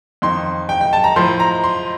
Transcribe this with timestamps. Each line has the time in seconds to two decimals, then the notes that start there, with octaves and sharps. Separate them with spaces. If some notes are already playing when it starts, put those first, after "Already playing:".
0.22 F2 D#3 C6
0.69 G5
0.81 G5
0.93 A5
1.04 A#5
1.16 A2 F3 C6
1.40 A#5
1.64 C6